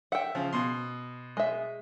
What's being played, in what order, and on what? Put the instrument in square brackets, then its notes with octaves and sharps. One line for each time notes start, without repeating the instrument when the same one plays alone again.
[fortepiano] E5 [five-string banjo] F#5 G5
[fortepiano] C#3 F3
B2 C6
[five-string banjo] G#3 E5